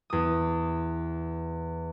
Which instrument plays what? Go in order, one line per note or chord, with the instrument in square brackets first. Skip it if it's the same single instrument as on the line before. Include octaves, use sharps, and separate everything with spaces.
[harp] E2 D#6